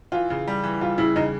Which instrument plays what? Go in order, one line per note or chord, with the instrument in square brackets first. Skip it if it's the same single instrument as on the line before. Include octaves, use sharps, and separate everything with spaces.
[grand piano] E3 [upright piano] F4
[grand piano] C#3
G3
E3
[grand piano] G3 [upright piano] F4
[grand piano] C#3 [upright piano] E4
[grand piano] C#3 [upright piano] D#4